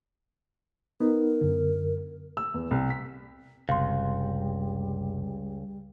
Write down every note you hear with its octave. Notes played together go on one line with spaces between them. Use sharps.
B3 D#4 A#4
F#2 D3
E6
E2
C2
B6
F#1 C#2 C3 G3 F5 C6